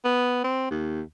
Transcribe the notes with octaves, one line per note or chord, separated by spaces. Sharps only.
B3
C4
D#2